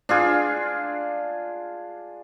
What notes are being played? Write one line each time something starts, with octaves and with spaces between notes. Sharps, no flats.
D4 F4 G#4